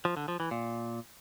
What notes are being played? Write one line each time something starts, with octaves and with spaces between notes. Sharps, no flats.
F3
D3
F3
E3
A#2